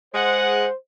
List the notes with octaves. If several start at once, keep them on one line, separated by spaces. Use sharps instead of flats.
G#3 C5 F#5